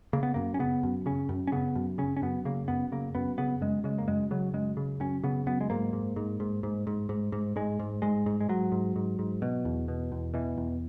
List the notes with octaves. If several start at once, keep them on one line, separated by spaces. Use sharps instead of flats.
C#3 A#3
B3
F#2 A#3
C#4
C#3 B3
F#2
C#3 C#4
F#2
C#4
C#3 B3
F#2
C#3 C#4
C#4
F#2 B3
C#3 A#3
F#2 B3
C#3 A#3
F#2 B3
C#3 B3
F#2 G#3
C#3 G#3
A#3
F#2 G#3
C#3 F#3
F#2 G#3
C#3
F#2 C#4
C#3 B3
F#2 B3
G#3
G#2 A#3
G#2
G#2
G#2
G#2
G#2
G#2
G#2
G#2 G#3
G#2
G#2 G#3
G#2
G#3
G#2 F#3
G#2
G#2
G#2
B2
E2
B2
E2
B2 E3
E2